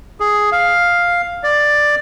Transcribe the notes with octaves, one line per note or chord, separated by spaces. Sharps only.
G#4
F5
D5